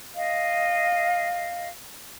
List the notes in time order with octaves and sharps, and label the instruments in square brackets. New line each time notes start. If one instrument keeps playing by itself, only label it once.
[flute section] D#5 F5